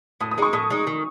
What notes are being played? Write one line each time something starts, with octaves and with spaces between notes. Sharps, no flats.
A2 D#6
D#6
G#3 D#4 C#6
A2 D#6
G#3 D#4
D#3